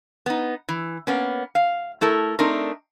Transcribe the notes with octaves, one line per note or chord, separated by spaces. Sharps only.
B3 D#4
E3
A#3 B3 C#4
F5
A3 E4 A4 A#4
A3 C4 D4 D#4 A#4